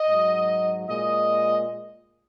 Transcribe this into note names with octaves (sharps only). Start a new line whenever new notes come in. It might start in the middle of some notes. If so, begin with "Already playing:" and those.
Already playing: D#5
G#2 F#3
A#2 G#3 D#5